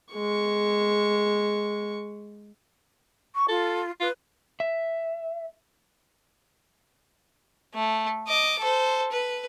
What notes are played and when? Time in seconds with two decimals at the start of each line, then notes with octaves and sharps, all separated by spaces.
0.14 G#3 C#6
3.34 C#6
3.49 F4 A4
4.01 F4 B4
4.60 E5
7.74 A3
8.27 D#5 D6
8.59 A4 C5
9.12 B4